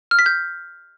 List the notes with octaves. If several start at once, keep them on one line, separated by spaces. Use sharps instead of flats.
F6
B6
G6